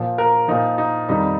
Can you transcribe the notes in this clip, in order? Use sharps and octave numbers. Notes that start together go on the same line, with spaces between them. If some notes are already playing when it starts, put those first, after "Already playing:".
Already playing: A#2 F3
A#4
A#2 F3 D#4
D#4
F2 D#3 G3 D#4